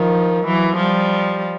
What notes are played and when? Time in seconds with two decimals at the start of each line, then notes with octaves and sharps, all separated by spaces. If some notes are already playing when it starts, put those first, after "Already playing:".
Already playing: D#3 F3
0.47 E3 F#3
0.78 F3 G3